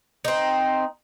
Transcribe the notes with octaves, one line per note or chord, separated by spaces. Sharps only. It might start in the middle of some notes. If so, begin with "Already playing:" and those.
C4 D#4